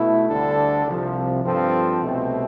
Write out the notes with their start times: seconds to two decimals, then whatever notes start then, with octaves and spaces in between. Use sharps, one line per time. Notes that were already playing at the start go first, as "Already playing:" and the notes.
Already playing: B2 A3 E4
0.28 D2 D3 G3 D4 A4
0.86 C2 C3 F3
1.44 G2 F3 C4 F4 A4
2.01 C2 B2 A3 C4